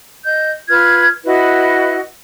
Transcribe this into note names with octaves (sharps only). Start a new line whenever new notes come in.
D#5 G6
F4 B4 F6 G#6
E4 F#4 B4 D#5